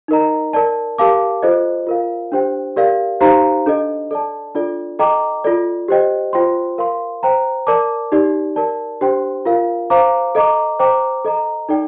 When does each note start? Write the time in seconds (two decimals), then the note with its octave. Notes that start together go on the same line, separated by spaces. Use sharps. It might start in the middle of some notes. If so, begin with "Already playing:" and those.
0.08 D#4 A#4 D#5 A#5
0.53 A#4 D5 A5
0.98 G4 A#4 F5 A5 D6
1.43 F4 A4 C5 D#5
1.87 F4 A#4 F5
2.32 D4 G4 C5 G5
2.76 G4 A#4 D5 F5
3.20 D#4 G4 C5 F5 A#5
3.66 D4 A4 D#5
4.11 A4 D5 A5
4.55 D4 F4 A4 D5
4.99 A4 D#5 G5 A#5 D6
5.44 F4 A4 D5
5.88 G4 C5 D#5 G5
6.33 F4 C5 G5 C6
6.78 A#4 F5 C6
7.23 C5 G5 A#5
7.67 A#4 D5 A5 D6
8.12 D#4 G4 D5
8.56 A#4 D5 A5
9.01 D4 G4 C5 G5 C6
9.45 F4 A#4 F5
9.90 C5 F5 A#5 D6
10.35 A4 D#5 A#5 D6
10.79 C5 G5 A#5 D6
11.25 A4 D#5 A#5
11.69 D#4 A4 D5 G5